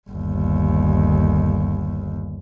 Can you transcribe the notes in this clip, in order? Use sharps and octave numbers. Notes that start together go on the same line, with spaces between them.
G1 D#2